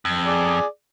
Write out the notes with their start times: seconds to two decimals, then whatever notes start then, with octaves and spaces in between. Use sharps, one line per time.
0.05 F2
0.26 G#4 D5